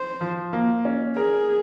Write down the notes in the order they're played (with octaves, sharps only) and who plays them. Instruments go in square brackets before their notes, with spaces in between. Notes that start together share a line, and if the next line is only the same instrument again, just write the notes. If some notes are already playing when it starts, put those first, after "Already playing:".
Already playing: [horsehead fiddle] C5
[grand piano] F3
A#3
C#4
[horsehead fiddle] G#4 [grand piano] A#4